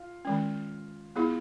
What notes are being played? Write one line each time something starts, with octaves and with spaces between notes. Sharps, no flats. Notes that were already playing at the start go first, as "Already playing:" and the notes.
Already playing: F4
D#3 G#3 C#4
B3 E4 F4 G#4